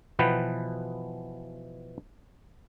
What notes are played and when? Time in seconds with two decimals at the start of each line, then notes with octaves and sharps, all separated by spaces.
0.19 B2 E3 F3 B3 B4 G5